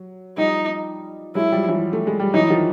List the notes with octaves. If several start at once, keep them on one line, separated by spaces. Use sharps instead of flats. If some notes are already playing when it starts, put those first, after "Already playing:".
Already playing: F#3
F3 G3 D#4
F#3 G#3 E4
F3 G3
E3 F#3
A3
G#3
G3
E3 F#3 D#4
D#3 F3